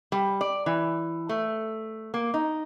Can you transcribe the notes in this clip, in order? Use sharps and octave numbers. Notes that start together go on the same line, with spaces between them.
G3
D5
E3
A3
A#3
D#4